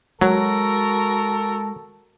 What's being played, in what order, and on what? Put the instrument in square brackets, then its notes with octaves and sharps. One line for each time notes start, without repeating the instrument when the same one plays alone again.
[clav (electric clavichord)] F#3 [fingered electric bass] G#3 [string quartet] F#4 A#4 [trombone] A4